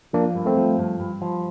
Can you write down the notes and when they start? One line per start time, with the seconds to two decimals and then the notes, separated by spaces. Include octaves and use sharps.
0.13 F3 A#3 D4
0.35 G2
0.46 A3 C4
0.57 F3
0.79 G2
1.00 G2
1.22 F3